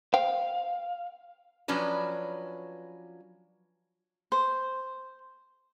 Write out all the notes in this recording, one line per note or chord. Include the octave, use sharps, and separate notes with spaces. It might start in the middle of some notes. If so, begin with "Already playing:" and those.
C5 F5 G5
F3 F#3 C#4 D4 B4
C5